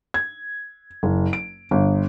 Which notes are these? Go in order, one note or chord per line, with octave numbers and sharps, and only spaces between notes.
G#6
F#1
D7
G1